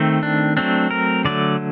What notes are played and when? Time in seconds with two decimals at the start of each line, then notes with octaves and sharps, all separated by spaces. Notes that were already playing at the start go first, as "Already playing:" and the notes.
Already playing: D#3 A3 C4
0.23 D4
0.57 F#3 A3 C4 D4
0.91 A#4
1.25 D3 F#3 A3 D5